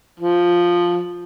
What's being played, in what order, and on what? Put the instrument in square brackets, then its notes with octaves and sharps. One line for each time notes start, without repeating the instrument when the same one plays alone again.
[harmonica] F3